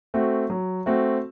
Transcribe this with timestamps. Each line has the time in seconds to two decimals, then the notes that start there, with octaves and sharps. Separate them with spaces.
0.14 A3 C4 F#4
0.50 F#3
0.86 A3 C4 F#4